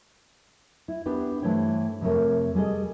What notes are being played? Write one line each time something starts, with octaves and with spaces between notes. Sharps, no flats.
E4
B3 D4 G4 B4
G2 E3 A3 C5 C#5 G5
F2 C3 A3 A#4 C#5
G3 G#4 A4 D#5